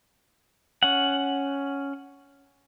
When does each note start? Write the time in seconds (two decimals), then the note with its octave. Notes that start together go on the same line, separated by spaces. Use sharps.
0.83 C#4 F#5